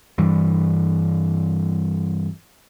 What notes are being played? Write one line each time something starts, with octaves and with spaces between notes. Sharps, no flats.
G2 E3 G3